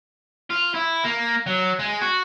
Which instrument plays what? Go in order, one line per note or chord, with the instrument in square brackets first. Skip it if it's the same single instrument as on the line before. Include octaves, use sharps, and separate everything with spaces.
[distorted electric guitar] F4
E4
A#3
F#3
G#3
F#4